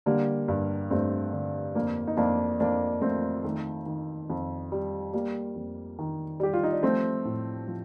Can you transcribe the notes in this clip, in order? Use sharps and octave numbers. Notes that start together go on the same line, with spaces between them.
D3 G3 A#3
G2
G2 A3 C4
D3
F2 A#3 D4
D#4
F2 A#3 D4
F2 A#3 D4
F2 A3 C4
D#3 A3
D#3
F2
G3
G3 A#3
F2
D#3
G3 G4
F4
D#4
D4
F3 A3 C4
A2
F3